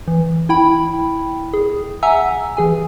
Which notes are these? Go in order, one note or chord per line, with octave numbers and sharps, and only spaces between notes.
E3
E4 G5 B5
G#4
E5 F#5 G#5 A#5 E6
E3 G#4 G#5